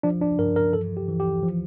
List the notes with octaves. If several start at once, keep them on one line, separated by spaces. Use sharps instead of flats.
F3 D4
D4
G2 A#4
A#4
E3 A4
G4
E3
G4
F3